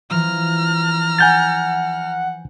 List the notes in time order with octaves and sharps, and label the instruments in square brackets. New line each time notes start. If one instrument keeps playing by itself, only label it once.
[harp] E3 F3 [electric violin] A#5 F6
[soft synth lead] F#5 [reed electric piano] G#5 G6 A6